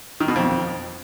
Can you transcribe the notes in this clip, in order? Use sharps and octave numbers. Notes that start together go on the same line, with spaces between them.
D#3
B2
F2